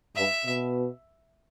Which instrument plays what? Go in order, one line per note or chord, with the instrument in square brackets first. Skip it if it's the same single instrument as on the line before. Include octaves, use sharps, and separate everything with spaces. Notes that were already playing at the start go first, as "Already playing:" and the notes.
[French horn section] G2 [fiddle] E5
[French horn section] B2